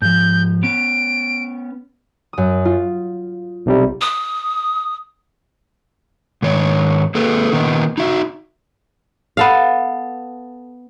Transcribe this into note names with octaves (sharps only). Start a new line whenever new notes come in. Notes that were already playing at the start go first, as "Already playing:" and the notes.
G#2 F3 G6
B3 C#4 D7
F#2 D#6
F4
B1 C3 G3
D#6
G#2 D#3 C#5
A#3 G#4 A4 B4
A#2 D#3 B3 D#4
D#4 F#4 E5
B3 A4 F5